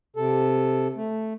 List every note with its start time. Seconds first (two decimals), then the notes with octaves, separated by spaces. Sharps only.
0.16 C3 A4
0.96 A3